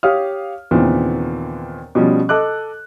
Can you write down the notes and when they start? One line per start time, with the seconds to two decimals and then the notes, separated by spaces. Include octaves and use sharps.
0.03 G4 C#5 F5 D#6 F6
0.71 D#2 A#2 C#3 E3 B3 C4
1.95 B2 F3 G3 C#4
2.29 A4 D#5 D6 F#6